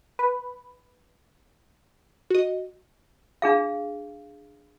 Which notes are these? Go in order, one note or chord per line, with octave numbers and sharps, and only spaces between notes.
B4
F#4 D#5
D4 G#4 F5